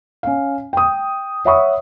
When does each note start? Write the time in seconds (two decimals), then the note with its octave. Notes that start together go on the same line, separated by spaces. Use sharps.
0.23 C#4 F5
0.73 G5 D#6
1.45 C#5 E5 F#5 B5 C#6 D#6